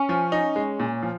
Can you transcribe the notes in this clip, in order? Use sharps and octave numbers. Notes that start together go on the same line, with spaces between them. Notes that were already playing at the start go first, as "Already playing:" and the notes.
Already playing: C#4
F3
D#4
G#3
A#2
F3